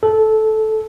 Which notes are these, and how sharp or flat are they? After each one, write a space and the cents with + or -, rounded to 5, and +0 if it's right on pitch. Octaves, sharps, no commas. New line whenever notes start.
A4 -15